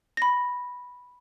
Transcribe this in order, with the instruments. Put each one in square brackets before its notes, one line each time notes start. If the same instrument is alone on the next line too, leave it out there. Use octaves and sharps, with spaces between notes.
[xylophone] B5 A#6